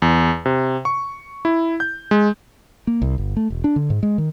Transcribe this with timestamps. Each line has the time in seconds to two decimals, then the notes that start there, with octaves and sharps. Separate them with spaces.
0.02 E2
0.46 C3
0.85 C#6
1.45 E4
1.80 G6
2.11 G#3
2.87 A#3
3.02 C2
3.18 G1
3.37 A3
3.50 E1
3.64 D4
3.76 D3
3.90 G#2
4.03 G#3
4.18 D#3